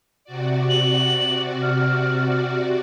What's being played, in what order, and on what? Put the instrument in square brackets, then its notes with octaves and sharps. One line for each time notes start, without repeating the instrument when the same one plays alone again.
[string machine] C3 F#4 D5
[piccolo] F#7
F6